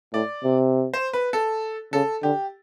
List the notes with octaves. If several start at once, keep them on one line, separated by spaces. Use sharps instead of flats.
A2 D5
C3
C5
B4
A4
C#3 A4
D3 G4